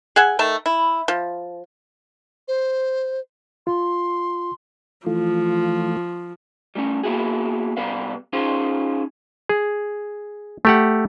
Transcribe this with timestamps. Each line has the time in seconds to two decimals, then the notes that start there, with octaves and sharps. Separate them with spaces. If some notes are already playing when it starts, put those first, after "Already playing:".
0.16 G#4 E5 F#5 G#5
0.39 D#3 A3 A5
0.66 E4
1.08 F3
2.48 C5
3.67 F4 C6
5.06 E3 F3 A3 F4
6.75 G3 A3 C4 C#4
7.03 A#3 B3 E4 F#4 G#4
7.77 C3 G3 B3 B4 F5
8.33 C#4 D#4 F4 G#4 C5
9.49 G#4
10.65 A3 G4 F#5